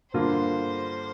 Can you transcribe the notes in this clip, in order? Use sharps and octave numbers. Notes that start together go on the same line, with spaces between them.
G2 D3 A#3 F4 C5